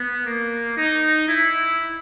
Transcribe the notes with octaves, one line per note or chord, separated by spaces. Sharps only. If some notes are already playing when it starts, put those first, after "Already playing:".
Already playing: B3
A#3
D#4
E4